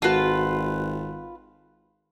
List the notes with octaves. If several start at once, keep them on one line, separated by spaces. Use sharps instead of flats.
G#1 F4 F#4 A4 B4